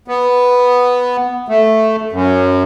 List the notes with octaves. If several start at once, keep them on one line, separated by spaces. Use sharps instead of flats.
B3
A3
F#2